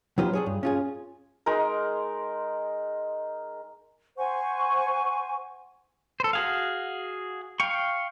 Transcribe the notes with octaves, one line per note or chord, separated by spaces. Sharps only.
F#3 D#4 F4 G4 B4 C5
D4 G#4 C#5
G2
C#4 F4 G#4
G#3 D#4 A#4
C5 F#5 G#5 C#6
A4 C5
F#4 G#4 F5
F5 G5 C#6